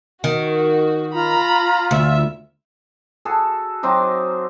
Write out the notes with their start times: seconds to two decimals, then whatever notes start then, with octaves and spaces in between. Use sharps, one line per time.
0.24 D#3 F#4
1.14 F4 A#5 B5
1.91 D2 E5
3.25 F#4 G#4 A4
3.83 F#3 C4 D#4 D6